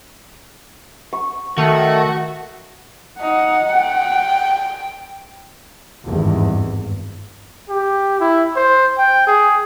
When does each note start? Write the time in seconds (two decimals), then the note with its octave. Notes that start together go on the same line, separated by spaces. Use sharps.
1.13 C#6
1.58 D#3 A3 F#4
3.21 D#4 F#5
3.73 G5
6.06 G#1 E2 G2
7.69 G4
8.20 E4
8.56 C5
8.98 G5
9.27 G#4